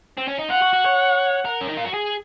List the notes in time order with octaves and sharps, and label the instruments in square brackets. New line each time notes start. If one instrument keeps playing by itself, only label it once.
[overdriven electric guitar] C4
C#4
D#4
[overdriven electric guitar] F4 [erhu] F#5
[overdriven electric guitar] F#4
F#4
C#5
A#4
C#4
D#4
F4
F#4
G#4